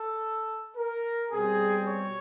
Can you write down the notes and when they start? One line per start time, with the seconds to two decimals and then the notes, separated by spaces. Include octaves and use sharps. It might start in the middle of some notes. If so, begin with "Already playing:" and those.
Already playing: A4
0.77 A#4
1.32 B2 G3 C4 G#4
1.87 C#5